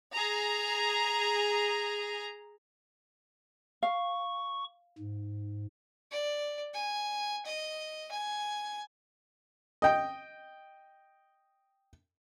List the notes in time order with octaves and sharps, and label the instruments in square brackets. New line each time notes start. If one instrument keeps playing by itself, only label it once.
[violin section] G#4 A#5
[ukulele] F5 [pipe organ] C#6
[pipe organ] G#2
[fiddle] D5
G#5
D#5
G#5
[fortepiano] D#5 G5